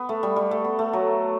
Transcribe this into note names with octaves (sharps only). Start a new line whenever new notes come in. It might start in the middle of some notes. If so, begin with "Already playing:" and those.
Already playing: B3
A3
G3
G3
A3
B3
A3
F#3